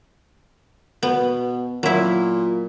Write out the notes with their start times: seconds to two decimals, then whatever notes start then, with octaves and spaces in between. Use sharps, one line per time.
1.03 B2 B3
1.83 A#2 F#3 E4